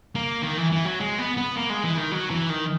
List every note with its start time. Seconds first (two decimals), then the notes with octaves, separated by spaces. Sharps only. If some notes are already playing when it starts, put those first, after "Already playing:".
0.15 A#3
0.43 D#3
0.57 E3
0.72 E3
0.85 F#3
1.00 G#3
1.18 B3
1.37 B3
1.56 A#3
1.70 G#3
1.84 E3
1.97 D#3
2.12 F#3
2.30 E3
2.49 D#3